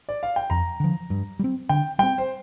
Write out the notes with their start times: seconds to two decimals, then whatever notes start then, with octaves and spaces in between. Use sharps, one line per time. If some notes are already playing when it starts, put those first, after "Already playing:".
0.09 D5
0.23 F5
0.36 G5
0.50 F2 A#5
0.80 D3 F3
1.10 G2
1.39 G3
1.44 C4
1.69 D3 G5
1.99 G3 C4 G5
2.18 C5